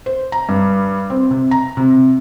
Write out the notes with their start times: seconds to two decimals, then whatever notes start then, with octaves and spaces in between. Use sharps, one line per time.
0.06 C5
0.32 A#5
0.49 G2
1.10 C4
1.31 C3
1.51 A#5
1.77 C3